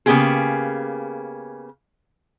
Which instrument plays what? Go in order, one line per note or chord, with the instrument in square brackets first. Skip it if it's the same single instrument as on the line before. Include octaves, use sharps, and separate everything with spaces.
[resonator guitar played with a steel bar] C#3 A#3 B3 F4 G4 G#4